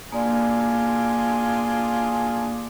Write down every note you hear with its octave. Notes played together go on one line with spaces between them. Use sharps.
A#3 D4 F4 G#4 D5